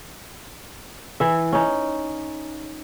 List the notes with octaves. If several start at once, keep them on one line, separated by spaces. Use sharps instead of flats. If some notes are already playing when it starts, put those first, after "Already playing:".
E3 E5
C#4 D#4